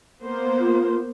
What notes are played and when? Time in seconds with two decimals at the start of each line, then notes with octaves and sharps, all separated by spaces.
0.22 A#3 B3 C5
0.60 F4